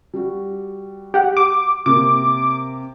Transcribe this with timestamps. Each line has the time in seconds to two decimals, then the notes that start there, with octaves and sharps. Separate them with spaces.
0.14 G3 F#4
1.14 G4 F#5
1.37 D6
1.86 C3 A#3 D6